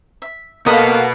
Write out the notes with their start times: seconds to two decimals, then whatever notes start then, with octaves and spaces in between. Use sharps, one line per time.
0.22 E5
0.66 B2 A#3 A4 B4 D#5 F5 F#5 B5